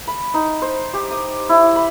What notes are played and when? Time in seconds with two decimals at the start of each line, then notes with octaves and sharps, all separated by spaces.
0.08 B5
0.34 D#4
0.62 C5
0.94 G4
1.11 D#6
1.49 E4
1.76 B5